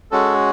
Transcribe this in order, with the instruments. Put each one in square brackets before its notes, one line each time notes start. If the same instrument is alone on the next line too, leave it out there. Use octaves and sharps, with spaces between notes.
[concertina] G#3 C#4 F#4 A4